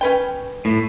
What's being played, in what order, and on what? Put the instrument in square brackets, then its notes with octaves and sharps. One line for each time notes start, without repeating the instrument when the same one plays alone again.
[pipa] C#4 B4 G5
[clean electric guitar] A2